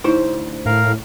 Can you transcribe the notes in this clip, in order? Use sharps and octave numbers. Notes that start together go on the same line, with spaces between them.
D2 D#4 E4 C5
A2 A#4 F5